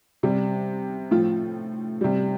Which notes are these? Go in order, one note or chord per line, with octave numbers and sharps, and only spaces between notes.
C3 G3
A2 F3 F4
C3 G3